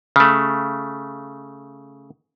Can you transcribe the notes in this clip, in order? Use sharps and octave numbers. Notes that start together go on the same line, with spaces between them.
C#3 A3